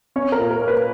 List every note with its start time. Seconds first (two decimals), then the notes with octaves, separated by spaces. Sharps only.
0.16 C#4 C#5
0.32 A#4
0.39 A#2
0.51 A#4
0.61 A#3
0.68 B4